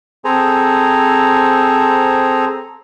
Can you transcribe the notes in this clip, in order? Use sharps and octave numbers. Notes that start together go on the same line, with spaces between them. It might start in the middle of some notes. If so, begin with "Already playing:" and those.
C4 G#4 A4 C5 G#5 A#5